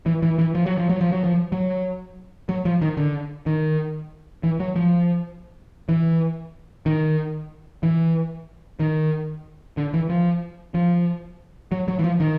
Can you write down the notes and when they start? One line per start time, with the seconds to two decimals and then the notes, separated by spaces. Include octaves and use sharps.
0.06 E3
0.22 E3
0.38 E3
0.55 F3
0.66 F#3
0.78 F3
0.89 F#3
1.01 F3
1.12 F#3
1.24 F3
1.52 F#3
2.49 F#3
2.65 F3
2.82 D#3
2.97 D3
3.46 D#3
4.43 E3
4.60 F#3
4.76 F3
5.89 E3
6.86 D#3
7.83 E3
8.80 D#3
9.77 D3
9.94 E3
10.09 F3
10.74 F3
11.72 F#3
11.88 F#3
11.99 E3
12.04 F3
12.20 D#3